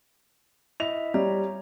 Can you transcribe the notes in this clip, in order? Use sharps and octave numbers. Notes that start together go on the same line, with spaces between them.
E4 D#5 E5 F7
G3 C#5 A#5